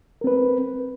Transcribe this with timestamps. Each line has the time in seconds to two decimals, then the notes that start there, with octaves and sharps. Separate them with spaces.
0.21 A#4
0.24 C4
0.27 B4